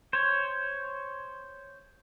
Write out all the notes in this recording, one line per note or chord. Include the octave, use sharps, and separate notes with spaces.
C5 C#5